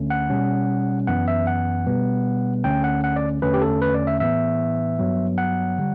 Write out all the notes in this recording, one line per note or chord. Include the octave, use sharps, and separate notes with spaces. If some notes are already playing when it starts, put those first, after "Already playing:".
Already playing: D2 D3 A3 C#4
F#5
B2 G3 C#4
F#2 E3 B3 F#5
E5
F#5
B2 G3 B3
D2 D3 A3 C#4 G5
F#5
F#5
D5
E2 D3 A3 C#4 B4
G4
A4
B4
D5
E5
A2 E3 B3 E5
G2 F#3 B3
F#5
D3 G3